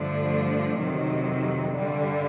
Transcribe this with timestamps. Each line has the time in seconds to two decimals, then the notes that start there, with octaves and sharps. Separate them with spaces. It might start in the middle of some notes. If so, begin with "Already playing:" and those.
Already playing: G2 D3 F3 A3 D4
0.78 F2 C3 D#3 F#3
1.75 G2 D3 G3